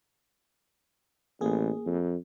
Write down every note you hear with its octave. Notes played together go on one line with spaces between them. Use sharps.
A1 A#3 G#4
F2